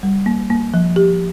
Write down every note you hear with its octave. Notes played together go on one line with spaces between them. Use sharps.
G3
A#3
A#3
F3
G4